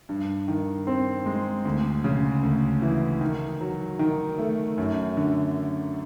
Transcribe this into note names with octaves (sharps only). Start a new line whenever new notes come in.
G2
D#3
C4
G#3
D2
C#3
D2
E3
D#3
F#3
D#3
A3
F#2
D3